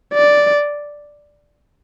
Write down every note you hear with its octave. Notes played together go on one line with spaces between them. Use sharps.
D5